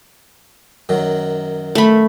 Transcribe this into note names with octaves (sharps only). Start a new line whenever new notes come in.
F#2 D#3 F#3
A3 B5